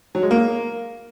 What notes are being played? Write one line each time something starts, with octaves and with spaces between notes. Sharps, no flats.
F#3
G#3
A#3